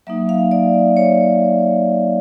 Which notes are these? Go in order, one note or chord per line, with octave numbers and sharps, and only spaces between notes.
F#3 A#3 D#4 E5
F5
D5
D5
C#5